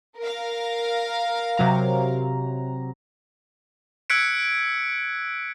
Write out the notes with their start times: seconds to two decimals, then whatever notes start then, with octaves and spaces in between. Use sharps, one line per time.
0.19 A#4 F5
1.57 C3 F#3 A#5
4.10 E6 F#6 G#6 B6 C#7 D7